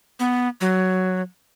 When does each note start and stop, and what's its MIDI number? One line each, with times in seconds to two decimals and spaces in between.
0.20 0.48 59
0.61 1.22 54